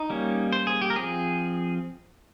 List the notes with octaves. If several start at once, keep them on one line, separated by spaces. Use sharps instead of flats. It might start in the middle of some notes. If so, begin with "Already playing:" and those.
Already playing: D#4
G3 A#3 C#4
C5
G#4
G4
A#4
F3 C4 G#4